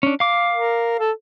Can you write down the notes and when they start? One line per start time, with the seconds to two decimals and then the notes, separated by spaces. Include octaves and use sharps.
0.03 C#4 D4
0.20 F5 D6
0.52 A#4
1.00 A4